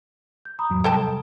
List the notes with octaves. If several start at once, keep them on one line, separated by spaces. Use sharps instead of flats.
G6
A#5 B5 D#6
E2 G#2 F#3
C3 G3 A4 G5 A5